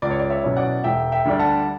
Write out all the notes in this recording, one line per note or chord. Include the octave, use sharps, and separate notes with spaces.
C#2 D5
C#5
D5
C#5 E5
B2 F#3 C#4 E4
D5 F#5
E1 E5 G5
E5 G5
D2 D3 G3 D4
F#5 A5